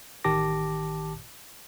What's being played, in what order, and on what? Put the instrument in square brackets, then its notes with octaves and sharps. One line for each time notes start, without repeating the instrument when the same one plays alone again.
[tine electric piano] A1 D#3 G4 A5 D6 A#6